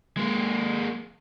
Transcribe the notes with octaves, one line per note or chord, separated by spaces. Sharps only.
G#3 A#3